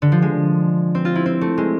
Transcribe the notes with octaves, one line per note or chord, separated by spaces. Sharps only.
D3
F3
G#3
C4
F4
E4
C4
A3
G#3